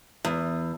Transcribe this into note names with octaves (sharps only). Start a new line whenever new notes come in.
E2